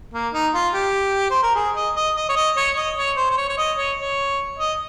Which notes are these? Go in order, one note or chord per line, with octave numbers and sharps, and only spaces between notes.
A#3
D#4
F4
G4
C5
A#4
G#4
D#5
D#5
D#5
C#5
D#5
C#5
D#5
C#5
C5
C5
C#5
C#5
D#5
C#5
C#5
D#5